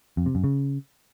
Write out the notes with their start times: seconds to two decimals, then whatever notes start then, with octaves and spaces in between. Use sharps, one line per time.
0.17 F2
0.26 C3
0.35 F#2
0.44 C#3